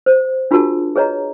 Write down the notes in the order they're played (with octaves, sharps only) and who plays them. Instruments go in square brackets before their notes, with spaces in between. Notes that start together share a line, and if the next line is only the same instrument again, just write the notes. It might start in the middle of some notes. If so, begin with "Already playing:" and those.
[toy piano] C5
D4 F4 F#4 G#4 A#4 A5
G#4 B4 C#5 D#5 A#5